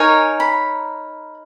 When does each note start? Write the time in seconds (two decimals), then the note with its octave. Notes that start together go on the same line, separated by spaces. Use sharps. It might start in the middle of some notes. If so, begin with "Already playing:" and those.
Already playing: D#4 A#4 C#5 G#5
0.40 B5